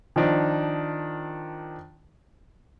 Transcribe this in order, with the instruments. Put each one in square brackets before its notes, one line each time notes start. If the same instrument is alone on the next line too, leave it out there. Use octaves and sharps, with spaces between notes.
[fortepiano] D#3 F3 D4 D#4